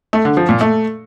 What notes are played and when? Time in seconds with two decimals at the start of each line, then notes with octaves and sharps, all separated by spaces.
0.13 A3
0.25 D3
0.37 F3
0.49 A#2
0.61 A3